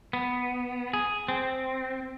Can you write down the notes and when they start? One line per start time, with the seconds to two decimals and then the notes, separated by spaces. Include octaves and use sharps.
0.13 B3
0.94 G#4
1.28 C4